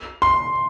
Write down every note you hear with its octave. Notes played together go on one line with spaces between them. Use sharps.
C6